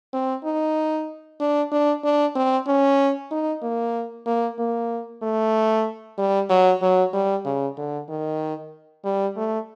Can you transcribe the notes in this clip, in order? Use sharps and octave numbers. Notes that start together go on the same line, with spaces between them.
C4
D#4
D4
D4
D4
C4
C#4
D#4
A#3
A#3
A#3
A3
G3
F#3
F#3
G3
C#3
D3
D#3
G3
A3